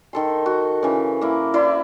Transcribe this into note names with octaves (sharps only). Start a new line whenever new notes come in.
D#3 A4 C6
F#4
C#3 E3
A#3 E4
E4 C5 D5